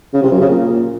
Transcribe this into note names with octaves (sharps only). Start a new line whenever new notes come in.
C#3
C3
F#2
C#3
A#2